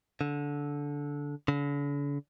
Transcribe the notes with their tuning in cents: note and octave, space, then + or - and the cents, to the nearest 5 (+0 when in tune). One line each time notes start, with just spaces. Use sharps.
D3 -15
D3 -45